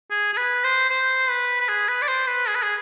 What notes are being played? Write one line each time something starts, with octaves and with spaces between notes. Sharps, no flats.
G#4
G#4
B4
C5
C5
B4
B4
G#4
B4
D5
C5
B4
G#4
B4
G#4